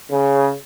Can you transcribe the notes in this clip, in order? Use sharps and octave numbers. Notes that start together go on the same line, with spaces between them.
C#3